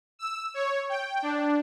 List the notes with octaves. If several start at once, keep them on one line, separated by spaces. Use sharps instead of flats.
E6
C#5
G5
D4